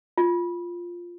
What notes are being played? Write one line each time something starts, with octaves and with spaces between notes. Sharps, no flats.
F4